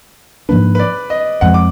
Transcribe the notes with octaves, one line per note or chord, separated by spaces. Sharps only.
G#2 F3 A#3 D4 B4
B4
D5
D#5
F2 F3 G#3 F#5
D6